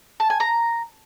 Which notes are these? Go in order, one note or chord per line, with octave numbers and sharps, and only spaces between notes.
A5
G#5
A#5